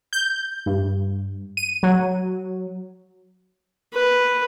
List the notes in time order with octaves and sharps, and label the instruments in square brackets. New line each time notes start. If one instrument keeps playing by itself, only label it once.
[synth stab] G6
G2
D#7
F#3
[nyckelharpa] B4